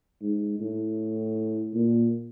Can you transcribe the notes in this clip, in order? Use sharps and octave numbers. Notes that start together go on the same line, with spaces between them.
G#2
A2
A#2